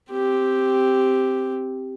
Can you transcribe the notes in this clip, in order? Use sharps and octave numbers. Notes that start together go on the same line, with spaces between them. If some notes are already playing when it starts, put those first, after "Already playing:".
C4 G4